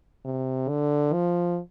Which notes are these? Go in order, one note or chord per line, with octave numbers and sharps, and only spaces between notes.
C3
D3
F3